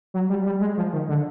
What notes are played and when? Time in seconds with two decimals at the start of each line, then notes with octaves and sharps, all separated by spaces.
0.14 F#3
0.30 G3
0.46 G3
0.61 G#3
0.77 F3
0.93 D#3
1.09 D3